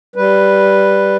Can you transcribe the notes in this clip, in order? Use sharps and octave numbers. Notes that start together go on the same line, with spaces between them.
G3 B4